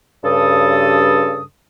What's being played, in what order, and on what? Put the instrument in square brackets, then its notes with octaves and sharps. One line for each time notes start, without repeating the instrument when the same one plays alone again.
[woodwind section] G2 C#3 A4 D#6